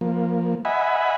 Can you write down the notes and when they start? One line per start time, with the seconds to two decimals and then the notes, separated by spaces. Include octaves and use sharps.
0.01 F3 A#3
0.65 D#5 E5 F#5 G#5 B5